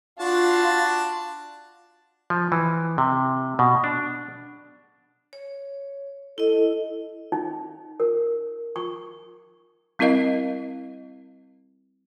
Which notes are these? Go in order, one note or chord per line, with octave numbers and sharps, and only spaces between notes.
D4 F4 F#4 A5
F3
E3
C3
B2
D4
C#5
E4 A4 D#5
D#4
A#4
C#6
G3 C4 E4 A#4 D#5 F5